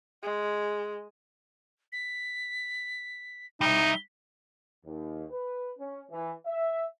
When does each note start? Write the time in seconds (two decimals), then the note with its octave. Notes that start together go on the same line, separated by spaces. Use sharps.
0.23 G#3
1.92 B6
3.61 G3 D#4 E5 G7
4.86 D#2
5.31 B4
5.79 C#4
6.10 E3
6.46 E5